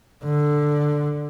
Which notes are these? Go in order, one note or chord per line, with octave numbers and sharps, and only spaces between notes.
D3